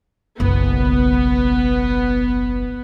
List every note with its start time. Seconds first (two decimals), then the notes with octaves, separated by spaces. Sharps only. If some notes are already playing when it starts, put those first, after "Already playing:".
0.40 F#1 B1 B3